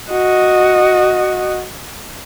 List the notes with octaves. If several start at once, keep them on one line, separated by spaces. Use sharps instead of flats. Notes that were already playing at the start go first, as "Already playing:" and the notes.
F#4 D#5